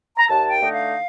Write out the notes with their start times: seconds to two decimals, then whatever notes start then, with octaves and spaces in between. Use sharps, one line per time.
0.17 A#5
0.28 D#2 A5
0.50 G5
0.61 D3 A3 D#4
0.73 F5